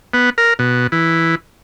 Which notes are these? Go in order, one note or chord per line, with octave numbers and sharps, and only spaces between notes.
B3
A#4
B2
E3